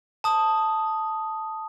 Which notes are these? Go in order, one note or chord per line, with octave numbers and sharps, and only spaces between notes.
A5 D#6